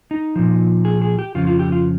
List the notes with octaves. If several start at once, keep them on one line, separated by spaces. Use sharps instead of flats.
D#4
A#2 F3
G#4
G#4
G4
F2 C#3 F3 F4
F4
G4
F4